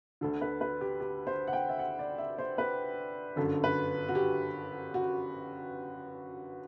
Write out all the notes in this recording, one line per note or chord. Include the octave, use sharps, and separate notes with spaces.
D2 D3 A4
B4
B4
G4
G4
C5
F#5
G5
E5
F#5
D5
E5
C5
B4
G1 F#2 D3 A4
B4
F#4
G4
F#4